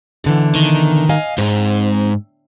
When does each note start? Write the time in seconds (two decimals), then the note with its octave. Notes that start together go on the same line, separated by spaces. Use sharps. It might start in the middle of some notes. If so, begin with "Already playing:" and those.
0.24 B2 D3 E3
0.55 D#3
1.09 D#5 F5 G#5
1.38 G#2 G#3 C4